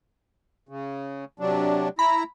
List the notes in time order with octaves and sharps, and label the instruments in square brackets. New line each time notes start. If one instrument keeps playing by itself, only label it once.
[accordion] C#3
C3 F#3 D4
[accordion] E4 A#5 [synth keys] B5